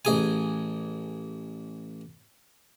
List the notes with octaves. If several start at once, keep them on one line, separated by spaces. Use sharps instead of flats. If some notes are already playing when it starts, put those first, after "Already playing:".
A1 G#4 G#5